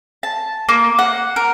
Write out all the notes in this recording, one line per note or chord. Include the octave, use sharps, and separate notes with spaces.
A5
A#3
F#5
A#4